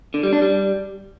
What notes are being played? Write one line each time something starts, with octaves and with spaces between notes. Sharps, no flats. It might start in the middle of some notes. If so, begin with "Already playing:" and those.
D3
G3
D4
G3